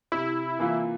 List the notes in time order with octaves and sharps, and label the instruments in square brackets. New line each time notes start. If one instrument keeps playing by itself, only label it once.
[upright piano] C3 [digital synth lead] E4
[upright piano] E3 A#3 F4